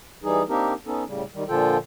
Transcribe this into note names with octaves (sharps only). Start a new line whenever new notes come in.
E3 G3 D#4 G#4
A#3 C4 D4 D#4 G4 A#4
B3 C#4 D#4 A4
A2 C#3 G3
D#3 G3
A#2 D3 F3 F4 A4 G5